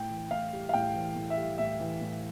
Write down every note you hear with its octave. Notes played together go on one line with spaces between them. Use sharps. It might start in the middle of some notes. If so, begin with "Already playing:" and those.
Already playing: A2 G5
E3
A2 F5
G3
F5
A2 G5
E3
A2
E5
G3
A2 E5
E3
A2